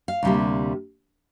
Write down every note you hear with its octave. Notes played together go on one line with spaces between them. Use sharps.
F5
D2 C3 G3 A#3